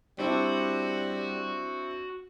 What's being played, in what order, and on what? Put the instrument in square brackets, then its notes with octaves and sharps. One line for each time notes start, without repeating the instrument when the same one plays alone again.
[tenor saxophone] G3 [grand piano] C4 D4 E4 [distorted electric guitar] F#4